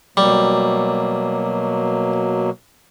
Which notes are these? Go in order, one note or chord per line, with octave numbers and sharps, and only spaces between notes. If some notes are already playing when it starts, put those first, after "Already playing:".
B2 F#3 G3 A#3